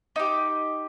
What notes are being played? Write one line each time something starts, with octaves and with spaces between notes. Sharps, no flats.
D#4 G4